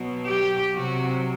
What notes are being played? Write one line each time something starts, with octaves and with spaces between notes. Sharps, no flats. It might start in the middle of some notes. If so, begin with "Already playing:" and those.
Already playing: B2 F#3
G4
C3 F#3 F#4